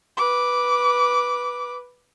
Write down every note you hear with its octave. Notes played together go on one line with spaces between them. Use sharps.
B4 D6